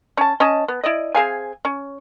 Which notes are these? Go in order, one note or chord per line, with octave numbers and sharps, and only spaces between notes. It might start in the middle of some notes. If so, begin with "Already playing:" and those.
C#4 A5
C#4 D#5 A5
B3
E4 D5 D#5
C4 G#4 F5 G#5
C#4